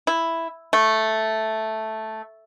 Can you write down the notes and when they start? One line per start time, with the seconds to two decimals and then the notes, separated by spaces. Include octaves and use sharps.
0.07 E4
0.73 A3